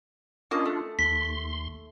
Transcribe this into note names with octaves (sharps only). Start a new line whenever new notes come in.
A#3 C#4 D4 F4 D#5
A3
D#2 C6 B6